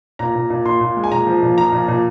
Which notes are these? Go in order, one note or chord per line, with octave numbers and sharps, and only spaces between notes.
A#2 A#5
A#2
A#2
A#2 C6
A#2
G#3
G#5
A#2 A#5
F3
A#2
F3 A#5
A#2
A#2